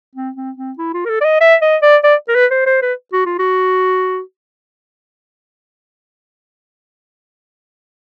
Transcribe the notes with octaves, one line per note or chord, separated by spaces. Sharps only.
C4
C4
C4
E4
F4
A#4
A4
D5
D#5
E5
D#5
D5
D5
A#4
B4
C5
C5
B4
F#4
F4
F#4